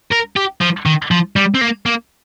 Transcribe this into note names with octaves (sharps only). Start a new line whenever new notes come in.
A#4
G4
F3
D#3
F3
G3
C4
A#3
A#3